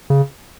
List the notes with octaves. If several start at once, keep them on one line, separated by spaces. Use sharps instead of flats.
C#3